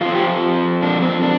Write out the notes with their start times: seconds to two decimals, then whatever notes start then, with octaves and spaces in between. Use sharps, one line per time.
0.01 F2 F3 C4 F4
0.15 G4
0.82 D4
1.02 C4
1.23 D4